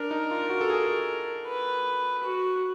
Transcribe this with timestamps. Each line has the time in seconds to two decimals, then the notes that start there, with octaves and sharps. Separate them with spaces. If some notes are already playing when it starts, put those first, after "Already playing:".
Already playing: D4 A#4
0.11 D#4
0.31 F4
0.49 F#4
0.61 A4
0.70 G#4
1.47 B4
2.24 F#4